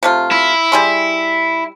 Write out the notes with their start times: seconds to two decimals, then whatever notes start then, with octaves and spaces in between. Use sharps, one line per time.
0.03 C3 A3 F4
0.31 E4
0.72 G3 G#4 C6